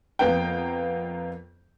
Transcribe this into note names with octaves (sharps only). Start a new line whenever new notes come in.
F2 A#3 B3 G5